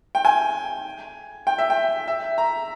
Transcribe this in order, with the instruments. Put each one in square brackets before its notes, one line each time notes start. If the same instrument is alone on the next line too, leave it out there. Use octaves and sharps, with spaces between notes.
[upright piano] G5
G#5
G5
E5
G5
E5
A#5